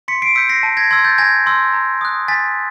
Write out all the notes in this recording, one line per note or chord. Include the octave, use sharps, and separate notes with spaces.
C6 B6 C#7
C7 D7
E6 G6 B6 C#7
A#6 C7
A5
G#6 A#6
C6 E6 G#6
G6 A6
G#5 G#6 A#6
C6 E6
A#5
D#6 F#6
G#5 A6 B6